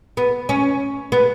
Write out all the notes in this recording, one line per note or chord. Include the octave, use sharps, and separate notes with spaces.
B3
C#4
B3